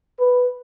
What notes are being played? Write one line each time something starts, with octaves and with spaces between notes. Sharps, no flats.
B4